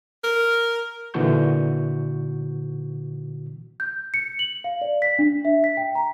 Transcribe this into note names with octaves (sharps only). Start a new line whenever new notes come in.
A#4
A#2 D3 E3 F#4 C#6 G6
G6
C#7
F#7
F5
D5
B6
D4
E5
B6
G5
A#5